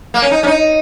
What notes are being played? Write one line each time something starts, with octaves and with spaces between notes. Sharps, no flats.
A#3
C#4
D#4
C#4
D#4